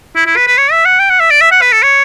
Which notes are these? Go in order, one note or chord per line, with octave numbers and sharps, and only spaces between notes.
E4
E4
B4
B4
C#5
E5
F#5
G5
F#5
E5
D5
E5
F#5
B4
A4
C#5